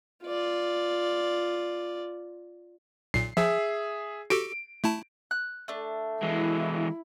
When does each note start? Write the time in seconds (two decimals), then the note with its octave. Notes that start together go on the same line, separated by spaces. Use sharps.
0.25 F4 D5
3.14 B1 A#2 C7
3.37 F3 G#4 E5
4.30 F#4 G4 A4 D7
4.84 A3 E4 A5
5.31 F#6
5.68 A3 D4
6.23 E3 G#3 E4